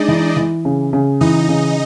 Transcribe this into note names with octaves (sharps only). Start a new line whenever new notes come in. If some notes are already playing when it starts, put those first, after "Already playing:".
Already playing: G#3 D4 D#4 D5 D#5
E3
E3
C#3
C#3
E3 D#4 D#5
C#3